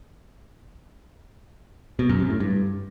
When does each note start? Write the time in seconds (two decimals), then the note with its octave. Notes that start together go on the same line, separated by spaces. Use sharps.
1.99 B2
2.09 F#2
2.20 C3
2.30 A2
2.40 G2